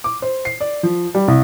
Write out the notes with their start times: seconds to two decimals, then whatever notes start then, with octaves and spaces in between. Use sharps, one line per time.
0.04 D6
0.22 C5
0.45 C7
0.61 D5
0.83 F3
1.15 G3
1.28 C2